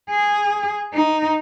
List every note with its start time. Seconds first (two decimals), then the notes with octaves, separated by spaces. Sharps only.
0.10 G#4
0.93 D#4